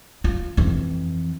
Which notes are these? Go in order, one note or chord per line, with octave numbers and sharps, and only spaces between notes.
F4
F2 E3